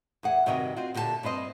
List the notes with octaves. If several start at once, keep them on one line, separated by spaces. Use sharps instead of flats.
E2 G#4 F#5
G2 C3 D#3 F#4 D#5 G5
C4 F4 F#4
A#2 D3 G4 G#4 A5
G2 C4 B4 C5 D#5